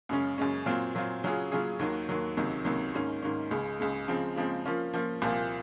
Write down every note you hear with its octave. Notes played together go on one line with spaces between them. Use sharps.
F#2 C#3 G#3 C#4
F#2 C#3 G#3 C#4
A#2 F#3 C4 F4
A#2 F#3 C4 F4
C#3 F#3 C#4 F4 G#4
C#3 F#3 C#4 F4 G#4
D#2 D#3 F#3 A#3
D#2 D#3 F#3 A#3
C#2 C3 D#3 F#3
C#2 C3 D#3 F#3
G#2 D#3 A#3 C#4
G#2 D#3 A#3 C#4
C#2 C#3 G#3
C#2 C#3 G#3
C#3 F3 G#3 C4
C#3 F3 G#3 C4
F3 A#3 C#4 F4
F3 A#3 C#4 F4
C2 A#2 F3 A#3 F4